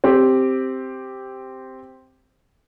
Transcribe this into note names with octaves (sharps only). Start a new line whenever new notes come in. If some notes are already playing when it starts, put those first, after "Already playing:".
C4 G4